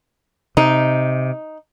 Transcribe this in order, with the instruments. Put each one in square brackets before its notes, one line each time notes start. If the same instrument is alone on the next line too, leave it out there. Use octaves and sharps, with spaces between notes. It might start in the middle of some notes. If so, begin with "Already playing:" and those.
[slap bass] C3 [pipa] D#4